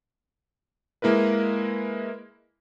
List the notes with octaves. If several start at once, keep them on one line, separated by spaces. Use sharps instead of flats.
G#3 A#3 E4 A#4 B4